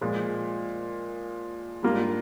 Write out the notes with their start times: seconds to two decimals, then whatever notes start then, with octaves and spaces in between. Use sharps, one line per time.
0.01 A#2 F3 G#3
1.83 G#2 G3 A#3 D4 F4